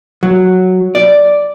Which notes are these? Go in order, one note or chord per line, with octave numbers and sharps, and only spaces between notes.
F#3
D5